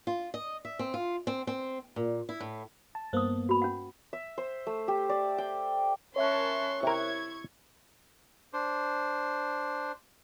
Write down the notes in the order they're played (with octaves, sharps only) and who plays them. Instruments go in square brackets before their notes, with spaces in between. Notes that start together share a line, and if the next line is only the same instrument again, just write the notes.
[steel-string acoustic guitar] F4
D#5
E5
C4
F4
C4
C4
A#2
E4
A2
[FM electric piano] A5
[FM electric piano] G2 A#3 B3 [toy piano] C5 D#6
[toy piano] F#4 B5
C#4 F#5
[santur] E5
C5
A3
G4
D5
G5
[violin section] C#4 A#4 A5 [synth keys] C#5 E5 F#6 [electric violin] C6 C#6
[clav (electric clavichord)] C3 A#4 [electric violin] E4 [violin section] C#6 G#6
[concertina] D4 C5